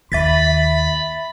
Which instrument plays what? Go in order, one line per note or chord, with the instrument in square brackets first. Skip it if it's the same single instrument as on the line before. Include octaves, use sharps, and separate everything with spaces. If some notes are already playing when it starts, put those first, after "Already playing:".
[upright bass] D#2 [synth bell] E5 A6 B6 [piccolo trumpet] B5